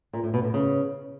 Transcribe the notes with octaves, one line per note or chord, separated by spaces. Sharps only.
A#2
A2
B2
A2
C#3